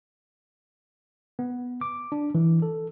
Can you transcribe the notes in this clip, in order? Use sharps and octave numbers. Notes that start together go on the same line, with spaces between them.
B3
D6
D4
E3
A4